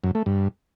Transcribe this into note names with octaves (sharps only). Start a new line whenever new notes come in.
F#2
A3
G2